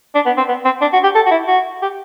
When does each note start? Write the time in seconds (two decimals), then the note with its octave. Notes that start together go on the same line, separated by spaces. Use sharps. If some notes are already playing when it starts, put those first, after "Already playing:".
0.15 D4
0.26 B3
0.37 C4
0.48 B3
0.65 C4
0.81 D4
0.93 F#4
1.03 G4
1.15 A4
1.26 F#4
1.31 E4
1.48 F#4
1.82 G4